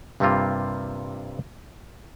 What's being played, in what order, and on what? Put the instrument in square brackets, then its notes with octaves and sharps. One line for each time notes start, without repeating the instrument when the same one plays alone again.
[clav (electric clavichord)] G2 C3 G3 A#3 C4 F4